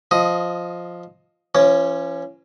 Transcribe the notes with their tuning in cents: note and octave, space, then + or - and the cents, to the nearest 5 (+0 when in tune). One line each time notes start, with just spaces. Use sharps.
F3 +0 D#5 +0 D#6 +15
F3 -45 C#4 +0 C#5 +0